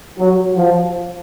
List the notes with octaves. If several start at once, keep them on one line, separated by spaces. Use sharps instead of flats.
F#3
F3